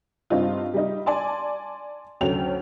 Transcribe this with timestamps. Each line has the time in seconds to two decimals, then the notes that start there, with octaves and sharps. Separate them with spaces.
0.30 G2 C4 D#4 F4
0.74 G3 D#4
1.06 D5 G#5 A5 C6
2.21 D2 F#3 C#4 A4 G5 F7